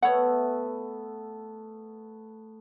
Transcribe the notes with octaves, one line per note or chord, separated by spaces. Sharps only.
A3 B3 C#5 E5 F#5